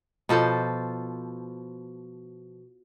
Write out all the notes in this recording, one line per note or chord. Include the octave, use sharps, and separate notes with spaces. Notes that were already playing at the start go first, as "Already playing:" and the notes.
B2 F3 A4 C5